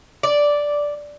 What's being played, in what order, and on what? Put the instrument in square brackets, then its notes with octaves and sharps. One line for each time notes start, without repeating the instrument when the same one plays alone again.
[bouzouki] D5